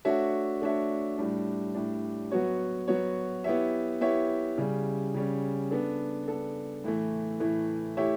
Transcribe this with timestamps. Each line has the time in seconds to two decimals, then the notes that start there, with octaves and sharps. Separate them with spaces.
0.05 A3 D4 F#4 C#5 E5
0.62 A3 D4 F#4 C#5 E5
1.18 A2 G3 D4
1.75 A2 G3 D4
2.31 F#3 B3 F#4 C#5
2.88 F#3 B3 F#4 C#5
3.44 B3 E4 G4 C#5 E5
4.01 B3 E4 G4 C#5 E5
4.58 C#3 G3 C#4
5.14 C#3 G3 C#4
5.71 B3 D4 A4
6.28 B3 D4 A4
6.84 A2 E3 A3
7.40 A2 E3 A3
7.97 A3 E4 G4 C#5 E5